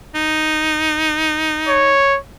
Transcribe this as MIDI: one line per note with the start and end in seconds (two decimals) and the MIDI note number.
0.15 1.98 63
1.68 2.18 73